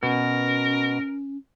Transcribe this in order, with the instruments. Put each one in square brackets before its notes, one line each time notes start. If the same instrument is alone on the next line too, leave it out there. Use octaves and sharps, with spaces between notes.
[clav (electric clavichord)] B2 [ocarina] C#4 [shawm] A#4